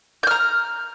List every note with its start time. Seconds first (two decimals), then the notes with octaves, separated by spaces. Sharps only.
0.23 G6
0.27 F6
0.31 A#5